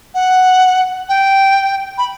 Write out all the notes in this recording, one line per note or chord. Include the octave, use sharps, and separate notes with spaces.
F#5
G5
B5